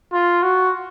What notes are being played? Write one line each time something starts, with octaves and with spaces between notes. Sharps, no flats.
F4
F#4